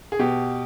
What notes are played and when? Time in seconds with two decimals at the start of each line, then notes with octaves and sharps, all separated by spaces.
0.12 G#4
0.19 B2 G4